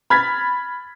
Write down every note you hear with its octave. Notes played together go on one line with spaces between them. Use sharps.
B5 F6 G#6 A6 B6